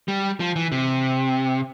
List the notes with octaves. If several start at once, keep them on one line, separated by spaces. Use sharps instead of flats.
G3
F3
E3
C3